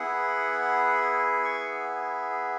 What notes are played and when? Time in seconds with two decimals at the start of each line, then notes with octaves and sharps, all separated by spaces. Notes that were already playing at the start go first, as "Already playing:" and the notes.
Already playing: B3 E4 G#4 F#5
1.44 C#6